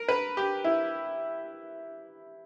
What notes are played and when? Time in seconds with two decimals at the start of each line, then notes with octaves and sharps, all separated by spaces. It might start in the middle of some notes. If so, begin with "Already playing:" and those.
Already playing: A#4
0.09 B4
0.37 G4
0.64 E4